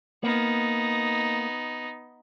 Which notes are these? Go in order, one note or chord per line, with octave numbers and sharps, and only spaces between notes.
A#3 B3 D#4